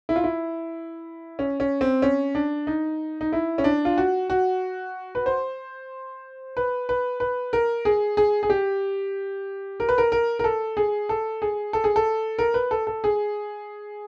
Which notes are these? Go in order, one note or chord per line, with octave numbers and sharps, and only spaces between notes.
E4
F4
E4
C#4
C#4
C4
C#4
D4
D#4
D#4
E4
C#4
D4
F4
F#4
F#4
B4
C5
B4
B4
B4
A#4
G#4
G#4
G#4
G4
A#4
B4
A#4
A#4
A#4
A4
G#4
A4
G#4
A4
G#4
A4
A#4
B4
A4
A4
G#4